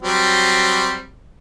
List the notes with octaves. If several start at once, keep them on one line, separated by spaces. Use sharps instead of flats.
F#3 G3 C4